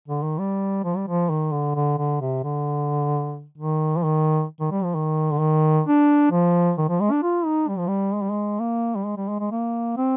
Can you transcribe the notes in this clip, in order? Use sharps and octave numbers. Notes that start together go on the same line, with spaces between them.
D3
D#3
G3
F3
G3
F3
D#3
D3
D3
D3
C3
D3
D#3
F3
D#3
D#3
G3
F3
D#3
D3
D#3
D4
F3
D#3
F3
G#3
D4
F4
D#4
G3
F3
G3
G#3
G3
G#3
A#3
G3
G#3
G3
G#3
G#3
A#3
C4